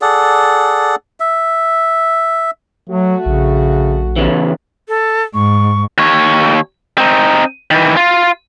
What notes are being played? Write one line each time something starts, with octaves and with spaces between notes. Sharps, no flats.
G#4 A4 D5 F#5
E5
F#3 A3 F#4
A#1 C#3
E2 C#3 E3
A4
G#2 C#6
D#2 C#5
C4 D#4
D#3 E3
F4